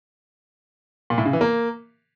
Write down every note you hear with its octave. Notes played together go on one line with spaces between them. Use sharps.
A#2
A2
C#3
E3
A#3